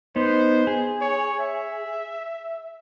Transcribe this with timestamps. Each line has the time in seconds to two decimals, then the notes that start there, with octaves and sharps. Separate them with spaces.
0.16 B3 D#4 C5
0.67 G#4
1.01 C#5
1.39 E5